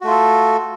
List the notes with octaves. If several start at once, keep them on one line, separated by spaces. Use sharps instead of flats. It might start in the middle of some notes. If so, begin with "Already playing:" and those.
A3 F4 F#4 A4